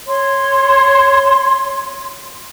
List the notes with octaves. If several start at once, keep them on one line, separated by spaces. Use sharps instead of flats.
C#5 C6